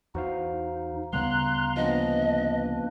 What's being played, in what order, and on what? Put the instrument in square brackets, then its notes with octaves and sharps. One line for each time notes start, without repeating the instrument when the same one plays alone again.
[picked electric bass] E2 [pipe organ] D#4 [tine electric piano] F#4 C5 F5
[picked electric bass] D2 C#3 G3 [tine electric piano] B3 [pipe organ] F5 A#5 C6 [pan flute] F#6
[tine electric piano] F3 B3 C#4 [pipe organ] A#3 D4 B4 [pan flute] D#5